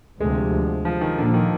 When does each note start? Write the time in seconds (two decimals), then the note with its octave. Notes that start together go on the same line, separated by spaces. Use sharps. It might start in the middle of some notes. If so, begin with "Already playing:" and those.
0.20 D2 C3 F3 G#3
0.85 F3
1.01 D#3
1.18 A#2 D3 F3 A#3
1.34 D#3